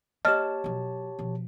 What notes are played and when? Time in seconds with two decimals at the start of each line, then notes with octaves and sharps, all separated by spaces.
0.25 A#3 G4 C#5 D#5 A5 F6
0.64 B2 F#3
1.19 B2 F3